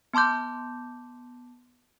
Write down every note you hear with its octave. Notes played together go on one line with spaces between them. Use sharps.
B3 A5 C6 D6 G6